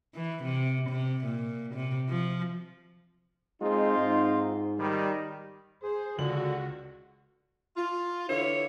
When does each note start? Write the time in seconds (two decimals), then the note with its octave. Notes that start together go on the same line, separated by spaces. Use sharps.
0.15 E3
0.44 C3
0.88 C3
1.24 A#2
1.75 C3
2.09 F3
3.61 G#3 C4 D#4 F4
3.98 G#2
4.78 D#3 G3
5.83 G#4 C5
6.18 C#2 D3 F#4 F#7
7.76 F4
8.29 D3 E3 F4 C#5